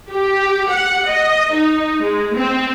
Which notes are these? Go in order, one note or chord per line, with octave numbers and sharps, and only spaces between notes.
G4
F#5
D#5
D#4
G#3
C4